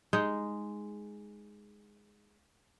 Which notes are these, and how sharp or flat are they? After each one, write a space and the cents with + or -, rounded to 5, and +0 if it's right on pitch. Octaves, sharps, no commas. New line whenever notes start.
G#3 +0 D#4 +0